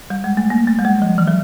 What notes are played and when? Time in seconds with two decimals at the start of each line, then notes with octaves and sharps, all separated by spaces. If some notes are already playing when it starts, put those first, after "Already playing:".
0.10 G3
0.24 G#3
0.37 A3
0.50 A#3
0.67 A3
0.79 G3
0.85 G#3
1.02 F3
1.18 E3
1.28 F#3